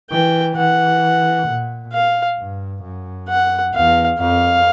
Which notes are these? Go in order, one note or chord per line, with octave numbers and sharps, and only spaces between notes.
E3 G5
E3 F#5
A#2
F5
G2
F#2
F#5
E2 F5
F2 F5